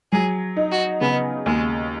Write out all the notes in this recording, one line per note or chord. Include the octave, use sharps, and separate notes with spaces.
F#3 G#4
D#4
F#4
C#3 B3
D#2 G#3